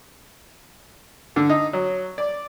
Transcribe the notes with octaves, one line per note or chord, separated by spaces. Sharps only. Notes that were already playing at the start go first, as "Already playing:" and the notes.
D3
D#4
F#3
D5